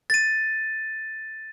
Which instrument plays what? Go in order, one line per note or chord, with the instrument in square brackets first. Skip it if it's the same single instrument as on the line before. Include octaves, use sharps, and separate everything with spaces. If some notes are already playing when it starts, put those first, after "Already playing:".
[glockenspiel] A6 D#7